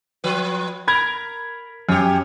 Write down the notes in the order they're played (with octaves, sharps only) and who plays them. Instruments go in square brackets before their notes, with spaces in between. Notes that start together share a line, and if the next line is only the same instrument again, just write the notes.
[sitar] F3 B4
[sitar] A#4 [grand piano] B5 G#6
[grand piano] F#2 [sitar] G4 C#5